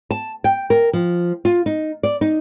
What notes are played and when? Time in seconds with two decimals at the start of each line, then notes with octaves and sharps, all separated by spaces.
0.11 A5
0.44 G5
0.70 A#4
0.93 F3
1.45 F4
1.66 D#4
2.03 D5
2.21 D#4